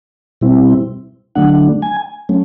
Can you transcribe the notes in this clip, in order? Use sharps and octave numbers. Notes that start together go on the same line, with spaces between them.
B2 G3 C4 E4
D3 F#3 A3 D4 F#5
G#5
F#3 A3 C#4